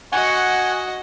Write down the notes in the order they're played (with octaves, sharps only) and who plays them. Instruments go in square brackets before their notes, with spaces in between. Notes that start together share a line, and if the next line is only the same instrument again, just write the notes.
[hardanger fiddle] F#4 D#5 [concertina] F#5 G#5 C#6